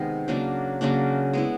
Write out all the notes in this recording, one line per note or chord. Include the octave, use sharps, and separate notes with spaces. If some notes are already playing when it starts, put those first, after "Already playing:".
Already playing: C3 D#3 G#3 B3
C#3 F#3 A#3 D4
C#3 F#3 A#3 D4
G#3 B3 E4